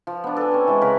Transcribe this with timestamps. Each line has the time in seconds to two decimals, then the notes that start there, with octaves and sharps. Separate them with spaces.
0.07 F3
0.24 B3 D4
0.37 A4 G#5
0.51 C4 C#4
0.67 E3 G#3
0.81 C#3 A#4 B4